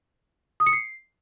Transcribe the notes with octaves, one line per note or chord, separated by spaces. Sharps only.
D#6
C#7
C7